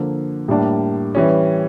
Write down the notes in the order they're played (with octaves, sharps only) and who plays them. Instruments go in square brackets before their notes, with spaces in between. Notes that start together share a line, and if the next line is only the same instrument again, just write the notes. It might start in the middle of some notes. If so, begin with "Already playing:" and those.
Already playing: [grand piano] D3 F3 A#3
A2 G3 A#3 D4
E3 G3 C#4